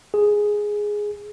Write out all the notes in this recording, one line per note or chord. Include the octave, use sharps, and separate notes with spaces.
G#4